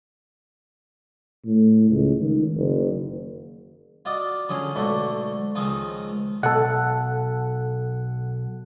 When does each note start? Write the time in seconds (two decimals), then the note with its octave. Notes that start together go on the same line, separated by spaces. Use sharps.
1.46 A2
1.90 C#2
2.21 D#3
2.56 F#1
4.05 F4 F#4 D5 D#5
4.49 D3 F3 F#3 C#4 F4 G#4
4.76 B1 G#2 D3 A3 F#4 B5
5.55 C#2 D#3 F3 C4 D#4 F4
6.43 B1 A4 F#5